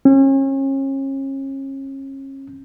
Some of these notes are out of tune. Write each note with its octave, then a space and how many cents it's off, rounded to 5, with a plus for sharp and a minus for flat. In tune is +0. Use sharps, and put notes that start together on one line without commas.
C#4 -35